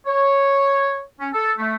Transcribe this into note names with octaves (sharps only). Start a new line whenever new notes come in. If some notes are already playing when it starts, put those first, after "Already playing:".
C#5
C#4
A4
A3